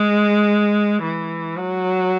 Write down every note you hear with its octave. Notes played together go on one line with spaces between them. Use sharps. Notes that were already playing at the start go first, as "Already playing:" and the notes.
Already playing: G#3
E3
F#3